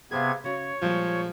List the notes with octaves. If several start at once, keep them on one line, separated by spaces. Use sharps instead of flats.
C3 B3 G#4 C5 F5 G#6
C#3 F#4 C#5
A#2 F3 G3 G#3